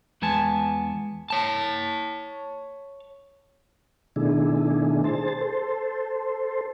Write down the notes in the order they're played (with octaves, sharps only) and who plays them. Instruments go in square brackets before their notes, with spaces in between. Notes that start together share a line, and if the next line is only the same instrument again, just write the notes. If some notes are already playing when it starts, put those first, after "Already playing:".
[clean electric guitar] E2 G#3 B3 G#5 A5
[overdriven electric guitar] C#5 A5
[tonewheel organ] B2 D#3 A3 D4 E4 G#4
G#4 C5 A5
A4 C5